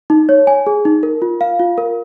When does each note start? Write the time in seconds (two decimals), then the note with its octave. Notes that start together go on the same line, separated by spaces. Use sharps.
0.10 D#4
0.29 C#5
0.47 G#5
0.67 G#4
0.85 D#4
1.03 A#4
1.22 F4
1.41 F5
1.59 F4
1.78 A#4